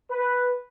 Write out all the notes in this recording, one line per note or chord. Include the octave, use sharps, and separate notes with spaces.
B4